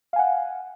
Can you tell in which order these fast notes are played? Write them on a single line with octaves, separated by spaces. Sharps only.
F5 G#5 F#5